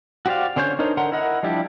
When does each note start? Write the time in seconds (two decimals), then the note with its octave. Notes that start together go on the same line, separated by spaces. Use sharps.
0.26 F#4 G4 C5 D5 F5
0.56 D3 C#4 C5 C#5 G6
0.79 D4 D#4 A#4 C5 C#5
0.97 D3 A#4 F#5 C6
1.12 E4 A#4 D#5 F#5
1.43 F3 G3 D4 E4 G4